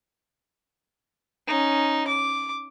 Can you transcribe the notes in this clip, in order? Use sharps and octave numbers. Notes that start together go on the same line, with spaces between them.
C#4 D#4
D6